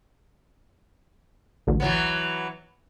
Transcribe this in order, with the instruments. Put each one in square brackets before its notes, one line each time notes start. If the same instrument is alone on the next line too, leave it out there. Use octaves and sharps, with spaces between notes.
[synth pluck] A1 D2
[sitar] E3 F#3 B3